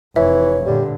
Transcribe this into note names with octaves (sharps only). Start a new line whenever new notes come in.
F1 E3 C#5 E5
A#2 D3 G3